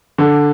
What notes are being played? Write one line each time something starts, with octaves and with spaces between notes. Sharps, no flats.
D3